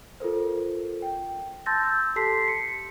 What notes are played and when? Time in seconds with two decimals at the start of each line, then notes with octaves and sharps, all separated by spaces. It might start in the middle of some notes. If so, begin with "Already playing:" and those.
0.20 F4 A4 A#4 C5
1.02 G5
1.66 A5 C6 E6 G6 A6 A#6
1.83 E6 G6
2.16 G4 A4 A5 C6 B6 C7
2.48 C#7